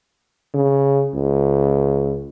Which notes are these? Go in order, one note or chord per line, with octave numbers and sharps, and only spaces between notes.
C#3
C#2